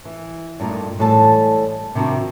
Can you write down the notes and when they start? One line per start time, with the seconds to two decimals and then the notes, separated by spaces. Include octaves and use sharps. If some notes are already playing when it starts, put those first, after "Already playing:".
0.05 E3
0.60 G2 A#2 A3 D#4
0.99 A2 E3 G3 G#3 A4 A5
1.95 C3 D#3 F3 D4 F#4